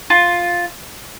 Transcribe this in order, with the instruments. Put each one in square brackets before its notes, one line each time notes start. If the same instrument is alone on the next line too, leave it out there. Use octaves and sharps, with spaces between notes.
[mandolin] F4